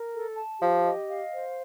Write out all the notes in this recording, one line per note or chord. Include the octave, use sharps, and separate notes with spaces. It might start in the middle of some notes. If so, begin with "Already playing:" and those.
Already playing: A#4
A4
A5
F3 G4
D#5
F5
C5